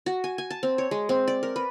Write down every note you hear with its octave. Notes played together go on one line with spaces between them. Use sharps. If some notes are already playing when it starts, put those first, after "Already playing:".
F#4
G#5
G#5
A5
C4
C#5
G#3
C4
D5
A#4
B4